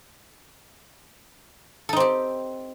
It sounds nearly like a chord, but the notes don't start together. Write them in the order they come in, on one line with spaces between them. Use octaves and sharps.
A4 D#4 C4 G4